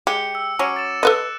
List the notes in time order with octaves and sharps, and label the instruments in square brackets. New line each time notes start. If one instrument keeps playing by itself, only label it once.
[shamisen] G#3 [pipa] G4 [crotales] C#7
[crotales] E6
[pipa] F#3 C#4 [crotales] D6 D7
[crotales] A6 E7
[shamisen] A4 B4 D#5 [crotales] F#6